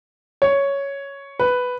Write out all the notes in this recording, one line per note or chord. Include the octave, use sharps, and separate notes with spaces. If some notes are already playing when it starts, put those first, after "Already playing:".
C#5
B4